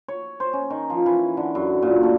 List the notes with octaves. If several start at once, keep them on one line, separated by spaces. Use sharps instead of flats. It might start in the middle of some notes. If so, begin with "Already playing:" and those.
C#5
C5
C#4
D#3
F3
E3
D3
F#2
A#2
A3